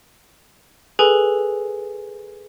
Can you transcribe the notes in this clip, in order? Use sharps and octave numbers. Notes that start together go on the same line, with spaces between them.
G#4 A4 B4 G#5